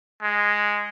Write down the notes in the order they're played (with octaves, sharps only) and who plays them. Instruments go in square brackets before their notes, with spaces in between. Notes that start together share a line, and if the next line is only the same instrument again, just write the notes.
[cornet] G#3